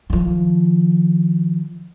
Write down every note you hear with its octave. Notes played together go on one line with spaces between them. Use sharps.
D#3 F3